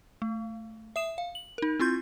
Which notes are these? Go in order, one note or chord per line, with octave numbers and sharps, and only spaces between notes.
A3
E5 D#6 E7
F5
F#7
D#4 A#4
C4 E4 F4 C6 G6